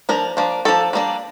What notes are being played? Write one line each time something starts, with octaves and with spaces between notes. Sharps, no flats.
F3 A#3 D4 A#4
F3 A#3 D4
F3 A#3 D4 A4
G3 A#3 D4